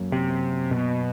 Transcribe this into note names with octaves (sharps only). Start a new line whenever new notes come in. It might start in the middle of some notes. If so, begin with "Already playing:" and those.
Already playing: F#2 F#3 A#3
C3
B2